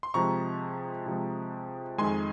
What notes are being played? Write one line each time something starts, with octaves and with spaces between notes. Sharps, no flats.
C6
C3 F3 G#3 A#5 C#6
C3 F3 G#3
F2 D#3 G#3 G#5 C6